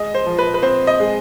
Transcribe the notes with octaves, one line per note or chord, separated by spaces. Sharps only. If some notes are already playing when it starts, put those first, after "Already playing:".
Already playing: G#3 D#5
C5
F3
B4
B4
C4 C5
D#5
G#3